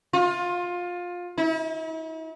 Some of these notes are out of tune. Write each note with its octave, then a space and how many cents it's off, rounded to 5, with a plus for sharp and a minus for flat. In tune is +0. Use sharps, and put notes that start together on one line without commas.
F4 +20
E4 -45